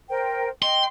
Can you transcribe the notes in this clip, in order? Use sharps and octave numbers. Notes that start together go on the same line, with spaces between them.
A#4 C5 G5
D#5 G5 C6